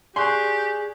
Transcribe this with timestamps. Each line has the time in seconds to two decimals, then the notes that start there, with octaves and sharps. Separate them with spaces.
0.16 G4 G#4 D5 C6 C#6 F#6